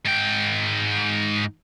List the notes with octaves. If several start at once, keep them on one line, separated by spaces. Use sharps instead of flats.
G#2 G5